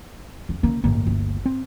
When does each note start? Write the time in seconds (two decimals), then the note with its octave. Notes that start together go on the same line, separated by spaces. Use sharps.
0.49 E2
0.63 C#3 A#3
0.84 A1 D2 G2 A#3
1.06 G1
1.46 C4